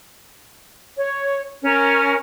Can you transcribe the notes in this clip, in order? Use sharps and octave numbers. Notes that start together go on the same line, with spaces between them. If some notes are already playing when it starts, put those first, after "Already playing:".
C#5
C#4 A#4